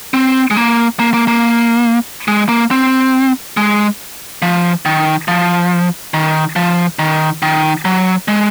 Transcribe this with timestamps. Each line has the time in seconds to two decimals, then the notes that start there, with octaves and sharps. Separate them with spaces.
0.14 C4
0.51 G#3
0.57 A#3
0.99 A#3
1.14 A#3
1.28 A#3
2.28 G#3
2.49 A#3
2.71 C4
3.57 G#3
4.42 F3
4.85 D#3
5.28 F3
6.14 D#3
6.56 F3
6.99 D#3
7.42 D#3
7.85 F#3
8.28 G#3